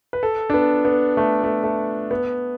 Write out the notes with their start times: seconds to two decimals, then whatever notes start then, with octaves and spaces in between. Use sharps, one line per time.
0.13 B4
0.23 A4
0.50 D4
0.54 B3
0.85 B3
1.17 A3
1.44 A3
1.64 A3
2.11 B3